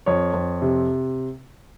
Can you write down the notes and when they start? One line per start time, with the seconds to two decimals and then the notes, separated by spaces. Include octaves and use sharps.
0.06 F2 C#5
0.34 F2
0.62 C3